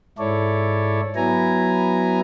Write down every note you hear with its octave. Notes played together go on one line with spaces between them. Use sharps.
G#2 E4 A4 C#5 D5
F#3 B3 E4 G#5 A#5